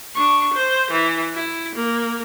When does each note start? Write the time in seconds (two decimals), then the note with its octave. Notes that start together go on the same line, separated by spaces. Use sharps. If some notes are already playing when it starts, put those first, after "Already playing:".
0.15 D4 C#6
0.53 C5
0.91 E3
1.34 E4
1.75 A#3